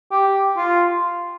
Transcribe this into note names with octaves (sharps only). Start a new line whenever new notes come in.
G4
F4